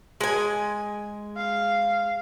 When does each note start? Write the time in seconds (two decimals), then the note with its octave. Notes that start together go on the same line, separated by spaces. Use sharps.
0.21 G#3 G#5
1.37 F5